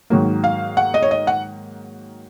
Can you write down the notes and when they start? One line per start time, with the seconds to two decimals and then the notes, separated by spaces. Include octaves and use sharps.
0.10 G#2 D#3 F#3 A#3
0.44 F5
0.77 F#5
0.94 D#5
1.02 C#5
1.11 D#5
1.27 F#5